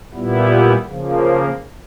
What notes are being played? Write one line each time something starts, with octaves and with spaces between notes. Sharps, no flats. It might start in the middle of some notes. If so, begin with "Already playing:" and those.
A#2 G3 B3 E4
C#3 F3 A#3